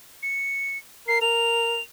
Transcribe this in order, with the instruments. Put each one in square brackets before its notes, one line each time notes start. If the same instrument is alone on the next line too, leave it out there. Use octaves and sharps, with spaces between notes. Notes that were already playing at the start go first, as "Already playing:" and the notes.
[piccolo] C#7
[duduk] A#4 [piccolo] C7
[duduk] A#4 [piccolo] F7